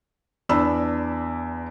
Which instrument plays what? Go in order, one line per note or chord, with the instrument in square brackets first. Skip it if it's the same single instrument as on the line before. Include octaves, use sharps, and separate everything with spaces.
[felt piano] E2 D4 B5 E6